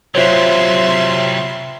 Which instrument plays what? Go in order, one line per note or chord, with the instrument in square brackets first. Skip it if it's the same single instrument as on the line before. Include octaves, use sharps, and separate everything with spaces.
[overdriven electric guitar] C3 F#3 [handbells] F4 C5 C#5 [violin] E5 C6